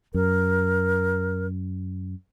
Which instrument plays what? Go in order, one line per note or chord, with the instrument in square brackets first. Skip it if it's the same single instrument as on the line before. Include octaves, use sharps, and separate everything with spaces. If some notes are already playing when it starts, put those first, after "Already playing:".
[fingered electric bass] F#2 [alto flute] A#4